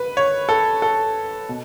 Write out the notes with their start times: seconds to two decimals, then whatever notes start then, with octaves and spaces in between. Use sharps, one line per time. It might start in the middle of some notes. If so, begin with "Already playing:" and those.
Already playing: B4
0.17 C#5
0.49 A4
0.82 A4
1.49 B2